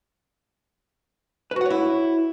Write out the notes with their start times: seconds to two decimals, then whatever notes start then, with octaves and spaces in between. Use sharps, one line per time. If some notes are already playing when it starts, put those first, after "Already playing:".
1.51 B4
1.56 F#4
1.61 F#5
1.66 C#5
1.70 E4